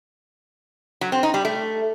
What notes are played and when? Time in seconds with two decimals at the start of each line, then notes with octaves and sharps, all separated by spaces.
1.01 F#3
1.12 C4
1.23 D#4
1.34 G3
1.45 A3